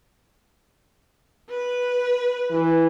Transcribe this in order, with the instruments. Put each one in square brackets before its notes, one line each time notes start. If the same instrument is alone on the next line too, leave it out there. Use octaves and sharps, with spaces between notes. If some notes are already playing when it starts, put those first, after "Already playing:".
[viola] B4
[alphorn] E3